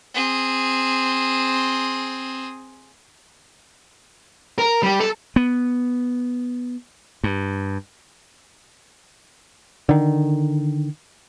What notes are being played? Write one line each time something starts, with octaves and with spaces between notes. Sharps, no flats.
C4 G#4
A#4
G3 G4
A4
B3
G2
D3 D#3